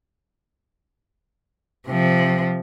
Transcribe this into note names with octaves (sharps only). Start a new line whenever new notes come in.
C3 F3